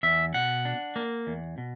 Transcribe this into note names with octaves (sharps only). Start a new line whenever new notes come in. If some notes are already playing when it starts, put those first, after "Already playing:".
E2 E5
B2 F#5
D4
A#3
E2
B2